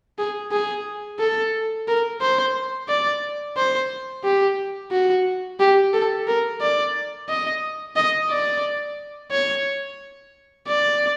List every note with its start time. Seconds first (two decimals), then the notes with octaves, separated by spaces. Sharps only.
0.18 G#4
0.52 G#4
1.19 A4
1.88 A#4
2.21 C5
2.88 D5
3.57 C5
4.24 G4
4.91 F#4
5.60 G4
5.93 A4
6.28 A#4
6.61 D5
7.29 D#5
7.96 D#5
8.30 D5
9.31 C#5
10.67 D5